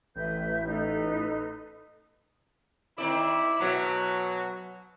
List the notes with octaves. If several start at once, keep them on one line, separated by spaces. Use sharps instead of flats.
A1 B4 E5 G6
D#4 A4 B4
D#3 C4 E4 D5
B2 F#3 E5